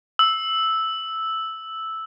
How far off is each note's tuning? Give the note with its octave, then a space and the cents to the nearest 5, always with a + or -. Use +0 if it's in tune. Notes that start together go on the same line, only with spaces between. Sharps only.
E6 -5